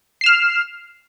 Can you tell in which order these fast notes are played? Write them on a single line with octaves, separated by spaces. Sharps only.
C7 E7 F6